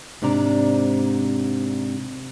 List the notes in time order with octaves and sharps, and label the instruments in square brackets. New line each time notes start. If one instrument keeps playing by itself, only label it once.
[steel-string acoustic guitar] G#2 C3 D4 D5 A#5